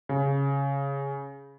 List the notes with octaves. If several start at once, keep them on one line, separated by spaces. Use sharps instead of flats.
C#3